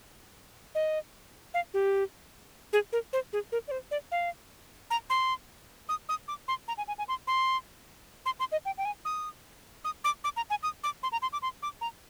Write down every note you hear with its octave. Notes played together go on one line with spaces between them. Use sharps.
D#5
F5
G4
G#4
A#4
C5
G#4
A#4
D5
C5
D5
F5
A#5
C6
D#6
D#6
D6
C6
A#5
G#5
G#5
G#5
C6
C6
C6
C6
D#5
G5
G5
G#5
D#6
D#6
D6
D6
A#5
G#5
D#6
D6
C6
A#5
C6
D6
C6
D6
A#5